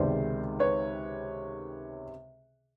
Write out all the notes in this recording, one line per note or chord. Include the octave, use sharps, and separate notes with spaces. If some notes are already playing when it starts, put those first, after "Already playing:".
Already playing: C#2 C3 D#3 G#3 B3 C5 D5
B4 C#5